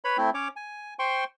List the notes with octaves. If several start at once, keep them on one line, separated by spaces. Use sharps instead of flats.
B4 C#5 B5
A3 C4 E4
C#4 C#5 D6
G#5
C5 G5 C6 C#6